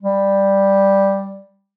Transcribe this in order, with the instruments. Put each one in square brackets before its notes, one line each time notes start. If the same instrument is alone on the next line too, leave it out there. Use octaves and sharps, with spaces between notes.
[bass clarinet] G3